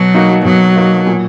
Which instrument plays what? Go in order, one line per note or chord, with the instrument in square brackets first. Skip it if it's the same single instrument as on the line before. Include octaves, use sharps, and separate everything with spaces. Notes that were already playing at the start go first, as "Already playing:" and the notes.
Already playing: [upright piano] B2 [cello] F#3
[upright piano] A#3 D#4 F#4
[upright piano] B2 [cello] F#3
[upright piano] A#3 D#4 F#4
A#2